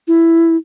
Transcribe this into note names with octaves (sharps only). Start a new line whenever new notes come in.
E4